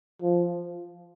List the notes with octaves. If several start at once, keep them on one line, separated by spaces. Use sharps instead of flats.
F3